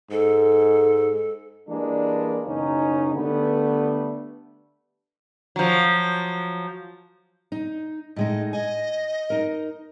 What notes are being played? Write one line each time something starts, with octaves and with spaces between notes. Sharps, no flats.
G#2 A4
E3 G3 G#3 A#3 D4
F#1 B2 C#4 D#4
D3 G3 A3 B3
F3 F#3
D#4
A2 G#3 D#4 D#5
D#5 G#5
D#4 A#4